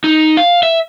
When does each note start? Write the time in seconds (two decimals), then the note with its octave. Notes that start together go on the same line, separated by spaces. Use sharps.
0.04 D#4
0.37 F5
0.63 E5